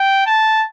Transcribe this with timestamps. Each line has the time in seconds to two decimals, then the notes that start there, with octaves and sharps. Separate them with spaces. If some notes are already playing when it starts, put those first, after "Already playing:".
Already playing: G5
0.26 A5